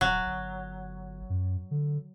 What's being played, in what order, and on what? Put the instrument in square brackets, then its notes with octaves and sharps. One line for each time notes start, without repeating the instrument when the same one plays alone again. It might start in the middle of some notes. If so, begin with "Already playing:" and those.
[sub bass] D#1 [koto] F#3
[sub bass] G1
F#2
D3